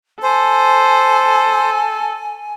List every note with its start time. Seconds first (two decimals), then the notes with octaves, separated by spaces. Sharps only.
0.23 A4 C5 G#5